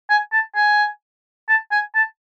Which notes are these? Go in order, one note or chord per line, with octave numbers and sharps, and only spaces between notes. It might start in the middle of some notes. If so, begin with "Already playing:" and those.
G#5
A5
G#5
A5
G#5
A5